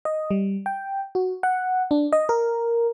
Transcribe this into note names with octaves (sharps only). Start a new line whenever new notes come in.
D#5
G3
G5
F#4
F#5
D4
D#5
A#4